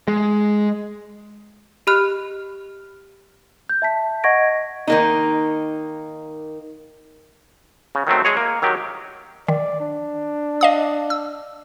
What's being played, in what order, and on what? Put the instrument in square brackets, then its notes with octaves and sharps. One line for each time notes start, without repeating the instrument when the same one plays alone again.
[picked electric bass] G#3
[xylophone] G4 D#5 B5 F6 F#6
[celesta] G6
E5 A5 B6
D#5 F#5 C#6 G#6 A#6 D7
[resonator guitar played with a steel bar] D#3 A#3 D#4
[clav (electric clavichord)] C#3
D#3 F#3 A3 C4
G#3 G#4 C#5
A#3
D#3 F#3 G4
[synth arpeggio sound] D#3 [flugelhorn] D5
[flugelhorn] D4
[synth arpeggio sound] D#5 F5 D#6
E6